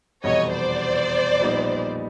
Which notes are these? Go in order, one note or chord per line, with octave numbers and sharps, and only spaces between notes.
F1 E2 B2 G3 C#5 D#5
C5 D5
A#1 A#2 G3 B3 D#4